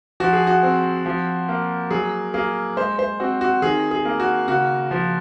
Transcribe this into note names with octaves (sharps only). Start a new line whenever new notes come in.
F3 F#4
G#4
F#4
C4
F3
A#3
F#3 G#4
A#3 G#4
G#3 C5
C5
C4 F#4
F#4
D#3 G#4
G#4
A#3
F#4
C#3 F#4
F3